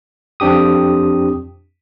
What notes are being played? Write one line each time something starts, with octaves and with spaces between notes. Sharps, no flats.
F2 C4 D4 G4 D#6